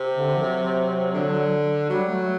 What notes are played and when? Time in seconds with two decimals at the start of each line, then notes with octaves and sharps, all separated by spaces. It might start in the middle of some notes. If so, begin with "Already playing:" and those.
Already playing: C3
0.13 D3
0.38 F#3
1.14 D3
1.89 F#3 G3
2.08 A3